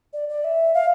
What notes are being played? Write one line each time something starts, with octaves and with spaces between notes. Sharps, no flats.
D5
D5
E5
F5